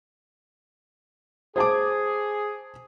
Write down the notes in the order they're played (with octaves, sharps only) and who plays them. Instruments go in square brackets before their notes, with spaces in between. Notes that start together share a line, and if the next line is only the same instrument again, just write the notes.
[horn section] G#4 [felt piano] C5 A5 D6